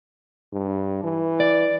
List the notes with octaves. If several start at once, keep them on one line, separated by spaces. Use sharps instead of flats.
G2
E3
D5